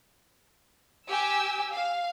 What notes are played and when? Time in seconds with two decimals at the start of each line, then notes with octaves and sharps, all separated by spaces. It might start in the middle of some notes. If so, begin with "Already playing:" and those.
1.08 G4 G#5 E6
1.72 F5